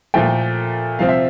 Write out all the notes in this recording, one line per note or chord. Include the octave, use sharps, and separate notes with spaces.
A#2 F3 A3 G5
C3 F3 C4 F5
E5